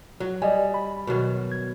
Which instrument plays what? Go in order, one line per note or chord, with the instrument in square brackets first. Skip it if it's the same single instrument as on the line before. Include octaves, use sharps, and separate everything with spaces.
[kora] F#3
[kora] G3 [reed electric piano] D5 D#5 G#5
[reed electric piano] B5
[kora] B2 D#3 F#3
[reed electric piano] G#6